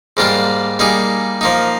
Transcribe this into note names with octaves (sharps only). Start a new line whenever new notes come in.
G#2 G3 A#3 D4 F4
G3 A#3 D#4 G#4
F3 A#3 D#4